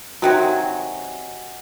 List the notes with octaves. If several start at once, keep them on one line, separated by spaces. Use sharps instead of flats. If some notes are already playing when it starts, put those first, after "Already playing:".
C3 D#3 F#3 F#4 G#5